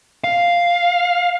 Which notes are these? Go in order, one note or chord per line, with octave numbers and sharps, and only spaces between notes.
F5